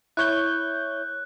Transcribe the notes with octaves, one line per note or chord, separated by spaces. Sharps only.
E4 C#5 F#6 G6